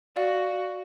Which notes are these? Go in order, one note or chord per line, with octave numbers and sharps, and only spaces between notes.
F#4 D5 F5